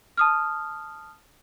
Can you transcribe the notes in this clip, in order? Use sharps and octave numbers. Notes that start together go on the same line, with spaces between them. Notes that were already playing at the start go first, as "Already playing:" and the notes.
A5 D#6 F6